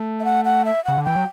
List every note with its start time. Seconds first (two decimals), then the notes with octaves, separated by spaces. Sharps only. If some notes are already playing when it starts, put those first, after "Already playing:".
Already playing: A3
0.20 E5
0.25 F#5
0.45 F#5
0.65 E5
0.85 C#3 F#5
0.98 D3
1.05 E3 G5
1.15 F#3